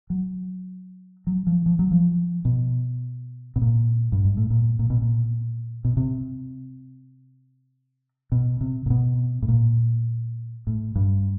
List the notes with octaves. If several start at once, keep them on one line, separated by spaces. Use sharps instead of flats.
F#3
F#3
F3
F3
F#3
F3
B2
B2
A#2
G2
G#2
A2
A#2
A#2
B2
A#2
B2
C3
B2
C3
A#2
B2
A2
A#2
A2
G2